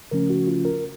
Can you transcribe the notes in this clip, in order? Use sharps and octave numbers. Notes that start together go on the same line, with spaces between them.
C#3 F3 A3 C#4 A#4
F#4
F4
A#4